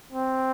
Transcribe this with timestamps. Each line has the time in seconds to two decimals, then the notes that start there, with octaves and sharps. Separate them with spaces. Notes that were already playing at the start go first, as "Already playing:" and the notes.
0.13 C4